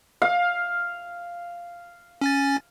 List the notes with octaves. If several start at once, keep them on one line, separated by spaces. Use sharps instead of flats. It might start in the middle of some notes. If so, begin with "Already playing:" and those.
F5
C#4 G#5 A6